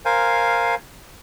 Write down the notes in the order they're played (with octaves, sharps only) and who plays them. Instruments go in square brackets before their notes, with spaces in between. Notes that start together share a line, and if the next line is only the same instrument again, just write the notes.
[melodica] A#4 C5 F5 G#5